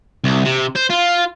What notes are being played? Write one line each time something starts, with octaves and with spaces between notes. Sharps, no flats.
C2
C3
C5
F4